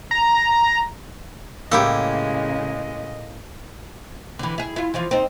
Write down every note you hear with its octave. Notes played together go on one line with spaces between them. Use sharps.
A#5
A2 C#3 G#3 A#3 E4 G4 A4 D#5
D3 E3
E4 G#4
E4 F4
E3 F3 F4
C4 D#4